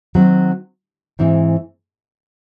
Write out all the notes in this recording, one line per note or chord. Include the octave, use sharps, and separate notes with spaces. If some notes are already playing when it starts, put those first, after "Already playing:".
D#3 F#3 C4 F#4
G#2 E3 C4 E4